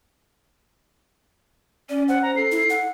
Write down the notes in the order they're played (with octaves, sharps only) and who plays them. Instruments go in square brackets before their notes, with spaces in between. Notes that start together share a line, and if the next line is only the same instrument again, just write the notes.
[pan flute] C#4 [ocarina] D5
[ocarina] C5 [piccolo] F#5
[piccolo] A#5
[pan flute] A4 [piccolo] C7
[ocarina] E4
F#5